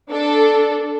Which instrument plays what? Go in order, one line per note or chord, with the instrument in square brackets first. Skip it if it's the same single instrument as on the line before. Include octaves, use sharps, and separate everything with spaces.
[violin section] D4 A4